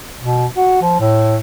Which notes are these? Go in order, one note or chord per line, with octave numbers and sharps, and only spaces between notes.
B2
F#4
F3
A2